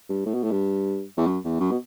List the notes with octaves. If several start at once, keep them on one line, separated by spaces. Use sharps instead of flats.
G2
A2
B2
A2
G2
E2
F#2
E2
F#2
B2